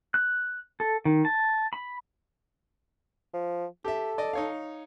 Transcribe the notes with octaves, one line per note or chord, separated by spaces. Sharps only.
F#6
A4
D#3
A5
B5
F3
G4 A4 E5
D5 D#5
D#4 C#5 F5